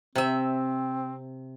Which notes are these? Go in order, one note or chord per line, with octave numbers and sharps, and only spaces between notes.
C3 C4 E5